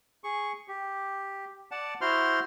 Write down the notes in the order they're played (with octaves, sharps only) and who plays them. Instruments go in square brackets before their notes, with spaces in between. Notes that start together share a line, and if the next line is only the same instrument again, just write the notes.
[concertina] G#4 C#6
G4
D5 F#5 A5
E4 F#4 C5 C6 F6